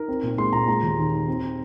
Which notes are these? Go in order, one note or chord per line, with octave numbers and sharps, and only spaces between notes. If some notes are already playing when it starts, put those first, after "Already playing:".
Already playing: D#4 A#4
C4
A#2
G#3 C6
A#2 A#5
G#3 A#5
D#2
D#3
D#4
C4